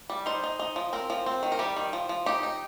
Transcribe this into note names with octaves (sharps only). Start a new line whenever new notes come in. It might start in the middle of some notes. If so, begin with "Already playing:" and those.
G3
D#4 C5
D#4
D#4
F3
C4 A#4
F3
C4
D#3
A#4
G3 G4
D#3
F3
F3
D#4 G4
D#4